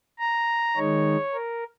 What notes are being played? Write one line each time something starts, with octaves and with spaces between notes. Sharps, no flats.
A#5
D#3 G#3 D#4 C#5
A#4